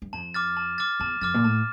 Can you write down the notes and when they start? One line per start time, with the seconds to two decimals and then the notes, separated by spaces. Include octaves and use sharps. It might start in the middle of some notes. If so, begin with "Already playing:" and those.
0.02 G2
0.13 F2 A5
0.34 D6 F6 A6
0.57 A5
0.78 D6 F6 A6
1.00 E2 A5
1.21 F2 D6 F6 A6
1.34 A#2
1.44 A2 A5